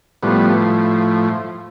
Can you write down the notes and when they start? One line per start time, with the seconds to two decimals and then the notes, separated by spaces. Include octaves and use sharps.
0.23 A2 F3 G3 B3